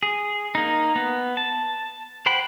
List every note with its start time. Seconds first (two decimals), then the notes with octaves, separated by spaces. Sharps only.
0.03 G#4
0.55 A#3 D#4
0.96 B3
1.37 A5
2.26 C5 F#5 G5 B5